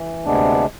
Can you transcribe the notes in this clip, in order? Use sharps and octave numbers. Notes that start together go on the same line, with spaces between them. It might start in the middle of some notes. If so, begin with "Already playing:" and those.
Already playing: E3
D2 C3 G#3 B3 D4